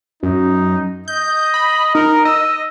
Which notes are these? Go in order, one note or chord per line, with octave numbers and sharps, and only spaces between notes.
F#2 D#4
D#5 G6
B5
D#4 A#4
D#5 E6